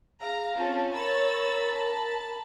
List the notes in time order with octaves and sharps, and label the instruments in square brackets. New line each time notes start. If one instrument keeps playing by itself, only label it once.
[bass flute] G#4 [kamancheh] F5 [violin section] A#5
[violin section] C4 C#4 A4 [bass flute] F4
[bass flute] A#4 [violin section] C#5 E6 A6 [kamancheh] A#5 B5
[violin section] A5